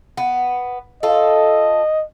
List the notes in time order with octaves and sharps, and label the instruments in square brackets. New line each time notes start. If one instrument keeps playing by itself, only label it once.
[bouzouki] B3
[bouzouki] F4 A4 [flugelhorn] D#5